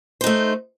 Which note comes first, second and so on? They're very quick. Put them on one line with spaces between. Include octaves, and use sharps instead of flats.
C5 D#4 A3